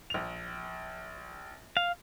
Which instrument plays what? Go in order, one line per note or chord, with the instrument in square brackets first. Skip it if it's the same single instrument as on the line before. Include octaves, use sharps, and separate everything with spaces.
[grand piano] A#1 F7
[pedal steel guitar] F5